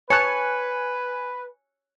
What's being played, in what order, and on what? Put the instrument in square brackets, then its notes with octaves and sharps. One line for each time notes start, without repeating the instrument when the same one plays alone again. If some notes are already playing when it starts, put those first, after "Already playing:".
[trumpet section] B4 [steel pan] C#5 A5 [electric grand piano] G#5 F#6 [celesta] C#7